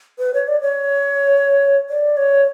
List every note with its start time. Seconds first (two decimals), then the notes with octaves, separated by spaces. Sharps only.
0.19 B4
0.34 C#5
0.48 D5
0.61 C#5
1.89 D5
2.17 C#5